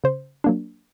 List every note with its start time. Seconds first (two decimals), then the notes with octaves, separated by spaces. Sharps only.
0.04 C#3 C5
0.44 F#3 A#3 D4